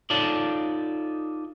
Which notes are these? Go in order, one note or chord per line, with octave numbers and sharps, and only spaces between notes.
D#4 F4 A4 C#5 D5